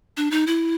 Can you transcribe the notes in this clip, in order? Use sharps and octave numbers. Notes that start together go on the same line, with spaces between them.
D4
D#4
E4